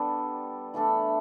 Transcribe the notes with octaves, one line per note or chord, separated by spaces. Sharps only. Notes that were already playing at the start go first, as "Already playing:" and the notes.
Already playing: G3 B3 D4 A4
E3 A3 D4 A4